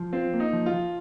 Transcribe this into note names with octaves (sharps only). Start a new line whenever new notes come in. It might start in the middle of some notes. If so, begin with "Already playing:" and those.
Already playing: F3
C4 F4
A#3
D#4
F3
F4
F3